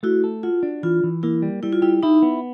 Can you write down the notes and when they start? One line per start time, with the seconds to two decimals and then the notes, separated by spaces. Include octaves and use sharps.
0.03 A3 E4 F#4
0.24 A4
0.43 F4 F#4
0.63 D4
0.83 E3 F4
1.04 E3
1.23 A#3 E4
1.42 G3
1.63 G3 E4
1.73 F4
1.82 E4 G4
2.03 D#4 E4
2.22 B3